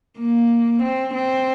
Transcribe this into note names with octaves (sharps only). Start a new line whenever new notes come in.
A#3
C4
C4